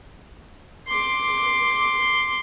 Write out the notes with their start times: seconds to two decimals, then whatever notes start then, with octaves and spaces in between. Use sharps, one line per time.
0.88 C6 D6